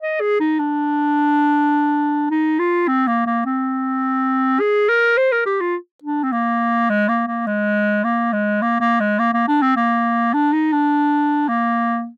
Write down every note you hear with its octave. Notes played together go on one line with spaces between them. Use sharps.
D#5
G#4
D#4
D4
D#4
F4
C4
A#3
A#3
C4
G#4
A#4
C5
A#4
G4
F4
D4
C4
A#3
G#3
A#3
A#3
G#3
A#3
G#3
A#3
A#3
G#3
A#3
A#3
D4
C4
A#3
D4
D#4
D4
A#3